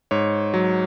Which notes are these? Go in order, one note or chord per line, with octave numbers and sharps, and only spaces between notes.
G#2 C#5
F#3